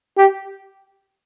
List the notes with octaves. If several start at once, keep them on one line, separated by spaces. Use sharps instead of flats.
G4